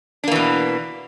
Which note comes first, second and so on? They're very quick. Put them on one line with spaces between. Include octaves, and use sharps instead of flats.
D4 A#3 E3 B2